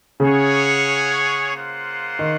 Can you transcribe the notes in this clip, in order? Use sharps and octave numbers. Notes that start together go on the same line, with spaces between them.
C#3 C#4 G#4 C#5 F#5
A#3 F4 C5 F#5
D#3